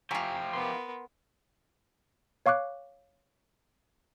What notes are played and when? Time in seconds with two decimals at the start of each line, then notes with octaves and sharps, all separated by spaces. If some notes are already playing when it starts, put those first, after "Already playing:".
0.11 F3 E4 F4 G4 G#5 A#5 C#6
0.53 B3 A#4 C6
2.46 C#5 F5 C#6 D6 F#6